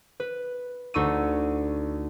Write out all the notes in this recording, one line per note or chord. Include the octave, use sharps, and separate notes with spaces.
B4
D2 D#4 C#6 E6 D#7